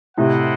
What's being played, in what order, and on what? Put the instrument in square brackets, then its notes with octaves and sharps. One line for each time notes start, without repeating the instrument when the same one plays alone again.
[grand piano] A2 C3 [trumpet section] E4 A4 C5 D#5 F#5